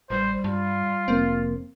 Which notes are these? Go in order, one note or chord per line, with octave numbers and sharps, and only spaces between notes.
A1 G3 C5
G2 F4
F1 A#3 C4